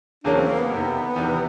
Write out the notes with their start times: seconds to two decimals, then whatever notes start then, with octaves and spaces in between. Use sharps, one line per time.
0.24 E2 C#3 F#3 A#3 C#4 D4
0.35 C4
0.47 A#3
0.58 B3
0.70 F2 C3 D#3
1.16 E2 C3 D#3